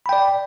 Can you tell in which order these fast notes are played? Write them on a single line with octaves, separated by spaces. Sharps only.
B5 G5 D5